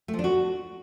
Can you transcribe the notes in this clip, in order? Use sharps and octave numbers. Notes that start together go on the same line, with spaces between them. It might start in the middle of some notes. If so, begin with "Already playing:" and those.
A3
F3
D4
F#4